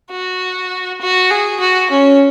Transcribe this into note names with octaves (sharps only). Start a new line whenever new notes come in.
F#4
F#4
G#4
F#4
C#4